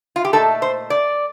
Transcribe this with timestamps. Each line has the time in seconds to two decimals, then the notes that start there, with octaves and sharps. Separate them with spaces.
0.16 F4
0.25 G4
0.33 A#2 A3 D#4 A4
0.62 C5
0.90 D5